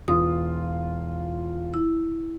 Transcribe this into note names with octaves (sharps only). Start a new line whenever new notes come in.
E1 F4 F5 D#6
E4